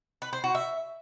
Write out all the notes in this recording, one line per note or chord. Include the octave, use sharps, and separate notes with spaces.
B4
C5
F#4
E5